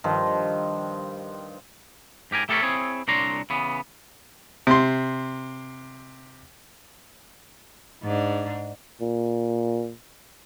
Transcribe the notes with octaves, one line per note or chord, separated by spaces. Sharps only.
G2 D#3 F3
G#2 G4 A#4 G#5
A3 G4 A4 A#4 C#5 E5
C4 E4 G#4 C#5
C2 A#2 D4 C#5 A#5 C6
C#3 E3 B3
C3 C6
G#2 D4
A#2